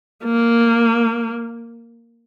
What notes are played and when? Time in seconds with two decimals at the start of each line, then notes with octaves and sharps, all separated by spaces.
0.25 A#3